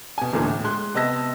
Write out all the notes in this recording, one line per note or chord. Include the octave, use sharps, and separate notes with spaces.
B2 G#5
E1 D2 A#2 A#3 D#4
A2
G#3 C6 F#6
C3 B3 D#5 A5 E6 A#6